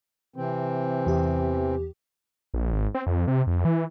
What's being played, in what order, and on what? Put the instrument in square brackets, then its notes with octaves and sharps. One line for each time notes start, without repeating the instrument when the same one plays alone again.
[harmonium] C3 E3 C4
[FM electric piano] E2 G4
[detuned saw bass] A#1
G#1
C4
F2
C3
F2
E3